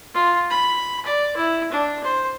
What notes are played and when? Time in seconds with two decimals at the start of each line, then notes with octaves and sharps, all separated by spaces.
0.14 F4
0.50 B5
1.05 D5
1.36 E4
1.72 D4
2.04 C5